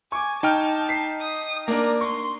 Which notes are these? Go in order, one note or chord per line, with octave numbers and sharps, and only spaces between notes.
G#5 C#6 D6
D#4 G5 A5 F6
B6 C7
D#6
A#3 D4 A#4 A#5
C6 C#6